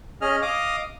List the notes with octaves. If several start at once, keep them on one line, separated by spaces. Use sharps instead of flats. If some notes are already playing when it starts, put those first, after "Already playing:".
C#4 G#4 D#5 F6
D#5 F5 D6 D#6 F6